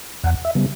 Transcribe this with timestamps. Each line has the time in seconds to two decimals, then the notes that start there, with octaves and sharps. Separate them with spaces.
0.24 E2 F#5
0.45 E5
0.55 C#3 G3 B3